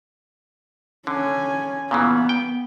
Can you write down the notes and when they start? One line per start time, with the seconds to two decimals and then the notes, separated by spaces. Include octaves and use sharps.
1.07 D3 C#4 G#5
1.91 A#2 C#3 E3 B3
2.29 G5